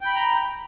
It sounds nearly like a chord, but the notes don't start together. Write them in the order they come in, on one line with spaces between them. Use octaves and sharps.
G5 B5 G6 A#5